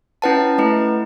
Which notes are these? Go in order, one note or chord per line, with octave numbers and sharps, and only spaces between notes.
C#4 E4 B4 F#5 A5
A3 E4 B4